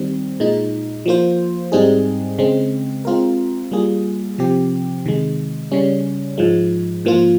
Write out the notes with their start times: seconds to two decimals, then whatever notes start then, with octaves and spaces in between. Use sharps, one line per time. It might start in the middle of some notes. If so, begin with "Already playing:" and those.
Already playing: D#3 G3 C4
0.40 A#2 G#3 D#4
1.06 F3 A#3 F4 C5
1.72 G#2 G3 C4 D#4 G#4
2.38 C#3 G#3 C4
3.05 G#3 C4 F4 A#4
3.72 G3 A#3 F4 G#4
4.38 C3 F3 C4 G4
5.06 C3 D#3 G#3
5.71 C#3 G3 C#4
6.38 G#2 F3 G#3
7.05 G#2 F3 A#3 F4